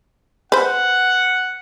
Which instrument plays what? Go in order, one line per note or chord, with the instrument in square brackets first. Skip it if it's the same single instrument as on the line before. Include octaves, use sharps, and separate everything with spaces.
[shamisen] B4 C5 [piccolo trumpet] F#5